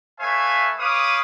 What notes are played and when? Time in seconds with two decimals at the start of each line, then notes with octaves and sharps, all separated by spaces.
0.20 A3 B4 C#5 E5 F5 G#5
0.79 B4 C#5 F5 D6 D#6